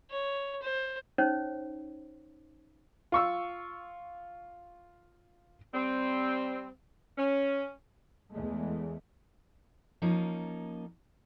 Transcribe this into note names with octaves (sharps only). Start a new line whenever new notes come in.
C#5
C5
C#4 D#4 C5 C#5
F4 C#6 E6
G3 C4
C#4
E2 G#3 A3
F3 A#3 C#4 D#4